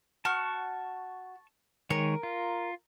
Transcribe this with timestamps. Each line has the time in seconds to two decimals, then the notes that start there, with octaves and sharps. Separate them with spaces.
0.25 F#4 A5 C#6 F6
1.90 D#3 G#3 A#4 C#5
2.23 F4